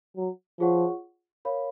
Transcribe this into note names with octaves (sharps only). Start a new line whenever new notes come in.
F#3
F3 F4 G#4 C#5 F#5 C#6
A#4 C#5 F5 B5